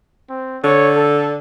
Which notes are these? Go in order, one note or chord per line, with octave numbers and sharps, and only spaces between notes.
C4
D3 C#5
A4